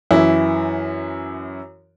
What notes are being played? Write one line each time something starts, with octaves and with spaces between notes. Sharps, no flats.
F#2 E3 E4